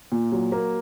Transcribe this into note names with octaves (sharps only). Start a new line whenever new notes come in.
A#2
F#3
A#3